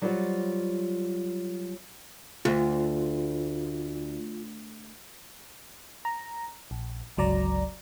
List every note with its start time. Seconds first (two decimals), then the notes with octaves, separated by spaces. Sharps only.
0.02 F#3 G3 F4 C5 D#5 F#5
2.45 D2 F4
6.05 A#5
6.71 A#1
7.17 G1 C#2 F#3 D5 A#5